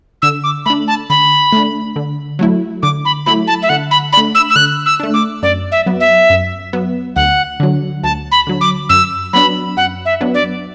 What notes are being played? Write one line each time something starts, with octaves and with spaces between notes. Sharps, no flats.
D3 E6
D6
A3 D4 B5
A5
D3 B5
A3 D4
D3
F#3 A3 E4
D3 D6
B5
F#3 A3 E4 B5
A5
E5
D3 F#5
B5
A3 D4 B5
E6
E6
D3 F#6
E6
A3 D4
D6
F#2 D5
E5
F#3 B3
E5
F#2
F#3 B3
D2 F#5
D3 F#3
D2 A5
B5
D3 F#3
D6
F#2 E6
F#3 B3 D4 B5
F#2 F#5
E5
F#3 B3 D4
D5